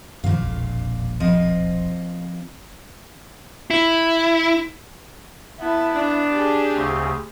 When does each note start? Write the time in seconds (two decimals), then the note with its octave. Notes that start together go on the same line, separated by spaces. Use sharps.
0.24 F#2 A#2 D#3 F3 F5
0.40 E1 A#1 F2
1.20 F3 C4 D#5
3.70 E4
5.60 B3 E4 A5
5.95 D4
6.32 G4 G#4
6.75 D2 C#3 C4